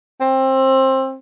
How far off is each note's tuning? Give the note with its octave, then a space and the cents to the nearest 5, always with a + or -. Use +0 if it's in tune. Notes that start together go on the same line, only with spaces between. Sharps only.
C4 +20